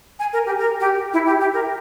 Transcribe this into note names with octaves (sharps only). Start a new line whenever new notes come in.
G#5
A#4
G4
A#4
G4
E4
G4
G4
A#4